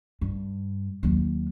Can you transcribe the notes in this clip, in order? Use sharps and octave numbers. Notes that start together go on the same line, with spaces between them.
G2
D#2 F#3